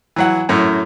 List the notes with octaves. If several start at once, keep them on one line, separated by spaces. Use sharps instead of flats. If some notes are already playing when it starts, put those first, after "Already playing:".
E3 F#3 F#5
F#2 A2